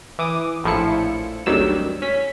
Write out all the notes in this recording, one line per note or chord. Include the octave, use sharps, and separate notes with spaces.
E3 D6 D#6
A#1 A2 F3 E4 C#7
G#1 D2 D#3 F#3 G3 E6
C#4 B6